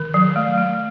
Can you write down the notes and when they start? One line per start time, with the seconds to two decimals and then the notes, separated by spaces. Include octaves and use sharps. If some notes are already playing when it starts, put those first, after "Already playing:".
Already playing: D#3
0.14 F#3
0.36 A3
0.58 A3